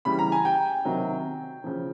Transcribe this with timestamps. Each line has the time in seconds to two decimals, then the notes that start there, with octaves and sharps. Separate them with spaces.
0.05 C#3 E3 G3 B5
0.19 A#5
0.32 G#5
0.45 G5
0.85 C3 D#3 F#3
1.64 C#3 F3